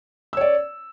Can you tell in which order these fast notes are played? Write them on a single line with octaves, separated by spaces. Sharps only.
E6 C#5 D5